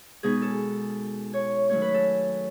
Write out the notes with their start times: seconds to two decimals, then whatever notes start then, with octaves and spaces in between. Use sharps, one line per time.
0.23 B2 G#3 D#4 G#4
0.42 A4
1.34 C#5
1.70 D#3 F#3 A3 C#4 C#5
1.82 B4
1.94 A4